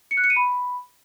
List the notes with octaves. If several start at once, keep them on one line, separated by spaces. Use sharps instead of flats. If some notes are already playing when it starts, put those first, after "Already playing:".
C#7
F#6
C#7
D#7
B5